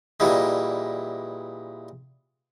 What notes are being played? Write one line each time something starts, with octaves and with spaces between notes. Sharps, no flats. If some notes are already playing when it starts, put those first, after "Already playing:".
A#2 E3 G3 G#3